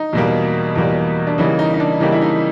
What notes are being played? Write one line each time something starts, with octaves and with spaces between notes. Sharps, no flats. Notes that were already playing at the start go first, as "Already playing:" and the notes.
Already playing: D#4
E2 B2 G3 A#3
E2 B2 G3 A#3
D4
C#3 E3 G3 A#3 D#4
D#4
D#4
D4
C#3 E3 G3 A#3 D#4
E4
D#4